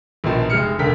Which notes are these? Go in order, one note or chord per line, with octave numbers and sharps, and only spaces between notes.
A#1 B2 D#3 F3
F1 G#3 F6 C#7
E1 C#2 D3 A#4 G5 B6